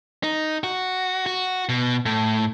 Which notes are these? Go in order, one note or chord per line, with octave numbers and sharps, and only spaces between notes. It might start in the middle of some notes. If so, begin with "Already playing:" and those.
D#4
F#4
F#4
B2
A2